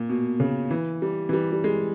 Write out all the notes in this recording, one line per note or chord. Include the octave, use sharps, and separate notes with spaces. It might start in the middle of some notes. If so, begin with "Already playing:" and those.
Already playing: A#2
B2
C#3
E3
G3
E3
G3
G3
G#3